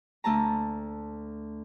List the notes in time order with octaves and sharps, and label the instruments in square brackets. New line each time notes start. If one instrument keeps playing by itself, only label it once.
[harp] D2 A3 A5 A#5